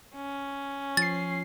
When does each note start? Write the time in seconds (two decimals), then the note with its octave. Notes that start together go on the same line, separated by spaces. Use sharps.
0.15 C#4
0.97 F3 A6 C7